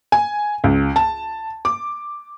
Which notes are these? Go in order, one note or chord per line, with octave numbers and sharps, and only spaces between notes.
G#5
C#2
A5
D6